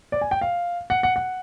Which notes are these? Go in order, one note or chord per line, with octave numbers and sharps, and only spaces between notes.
D5
G#5
G5
F5
F#5
F#5
F#5